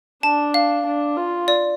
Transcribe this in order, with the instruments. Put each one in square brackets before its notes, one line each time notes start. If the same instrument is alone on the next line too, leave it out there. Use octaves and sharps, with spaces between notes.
[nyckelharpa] D4 [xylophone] A5
[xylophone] F5
[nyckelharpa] D4
F4
[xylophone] D5